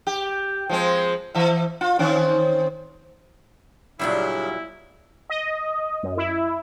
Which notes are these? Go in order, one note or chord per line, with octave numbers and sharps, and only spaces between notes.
G4
F3 G#3 C4
E3 E5
F4
D#3 C4 C#4
A#2 C#3 F#3 G3 D4 E4
D#5
F#2
E4